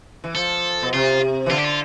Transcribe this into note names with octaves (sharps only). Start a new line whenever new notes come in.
E3
F3 A4
B2
C3 F4
E3
D3 F4
G4
F4